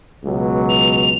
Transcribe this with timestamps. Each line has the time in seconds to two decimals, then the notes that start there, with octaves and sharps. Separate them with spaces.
0.25 C#2 B2 F#3
0.69 F7